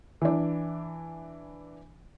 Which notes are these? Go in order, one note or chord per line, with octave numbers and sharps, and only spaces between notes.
E3 D4